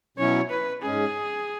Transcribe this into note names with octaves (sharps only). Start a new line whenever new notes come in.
B2 F#3 C#4 E4 C#5
B4
G#2 G#3 C#4 G#4